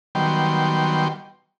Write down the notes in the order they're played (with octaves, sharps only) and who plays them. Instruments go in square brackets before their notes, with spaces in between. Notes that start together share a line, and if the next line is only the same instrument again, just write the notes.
[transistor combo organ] D#3 F#3 G3 B3 G5 C6